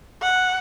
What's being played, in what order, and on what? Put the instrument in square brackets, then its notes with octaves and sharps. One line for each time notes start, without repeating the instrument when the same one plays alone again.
[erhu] F#5